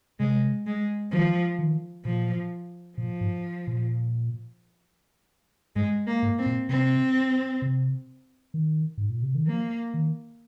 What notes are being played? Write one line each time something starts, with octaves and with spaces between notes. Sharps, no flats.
C3 G#3
G#3
D#3 F3
D#3
A#2 F3
A#2 F3
G#2
A#2
G#2 G#3
A#3
G#2
C4
A#2
C3 C4
C3
D#3
G#2
A#2
C3
D#3
F3 A#3
D#3